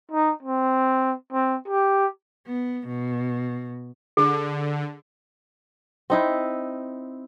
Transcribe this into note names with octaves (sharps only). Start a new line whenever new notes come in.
D#4
C4
C4
G4
B3
B2
D3 G#4
C4 D#4 E4